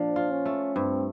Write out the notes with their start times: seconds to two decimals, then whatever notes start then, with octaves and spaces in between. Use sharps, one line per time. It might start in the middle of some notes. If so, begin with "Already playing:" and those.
Already playing: A#2 F3 D4
0.16 F4
0.31 C#4
0.46 A3
0.75 G2 C4